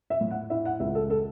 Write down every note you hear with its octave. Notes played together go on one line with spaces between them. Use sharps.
E5
A2
F#5
E4 E5
F#5
C#2 E5
A4
A4